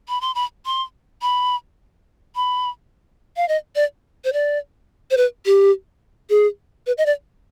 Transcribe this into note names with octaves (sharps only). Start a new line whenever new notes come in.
B5
C6
B5
C6
B5
B5
F5
D#5
D5
C5
D5
C5
B4
G4
G#4
B4
D#5
D5